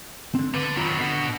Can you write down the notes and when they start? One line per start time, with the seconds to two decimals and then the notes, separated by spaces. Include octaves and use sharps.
0.35 D3 C4
0.55 D3 B4
0.77 D#3 F#3 F4 A#5 B5
0.99 B2 D3 F#4